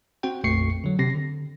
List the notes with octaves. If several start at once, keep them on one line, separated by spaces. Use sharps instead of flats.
C4 F#4 C5 G5
A#1 F2 A3 C#6 C7 C#7
D3 F#3
C3 C4 A#6 C7
D3